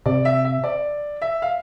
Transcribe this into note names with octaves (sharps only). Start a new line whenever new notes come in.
C3 D5
E5
E5
D5
E5
F5